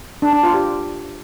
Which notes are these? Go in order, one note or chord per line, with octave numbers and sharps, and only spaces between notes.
D4
D4
F4
G4